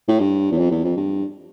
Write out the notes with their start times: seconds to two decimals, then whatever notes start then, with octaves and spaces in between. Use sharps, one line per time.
0.08 A2
0.20 G2
0.51 E2
0.58 F2
0.71 E2
0.84 F2
0.97 G2